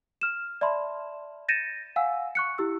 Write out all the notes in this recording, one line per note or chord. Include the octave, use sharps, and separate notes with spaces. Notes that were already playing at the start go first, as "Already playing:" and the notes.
F6 E7
D5 E5 A5 B5 C6
G6 A6 A#6 C#7 D#7 E7
F5 F#5 G#5 E6
C#6 F#6 C#7
E4 G4 E6